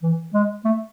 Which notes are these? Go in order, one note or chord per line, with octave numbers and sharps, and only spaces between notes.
E3
G#3
A3